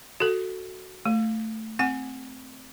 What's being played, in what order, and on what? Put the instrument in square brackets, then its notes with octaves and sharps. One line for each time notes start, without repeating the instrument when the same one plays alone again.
[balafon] F#4 A4
A3
C4 F#5